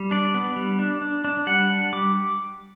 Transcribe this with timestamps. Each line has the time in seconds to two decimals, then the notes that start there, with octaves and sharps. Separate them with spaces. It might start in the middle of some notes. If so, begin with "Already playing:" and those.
Already playing: G3
0.11 D4 D5
0.34 B3
0.56 G3
0.79 D4
1.02 D4
1.24 D4
1.47 G3 F#5
1.70 D4
1.93 G3 D6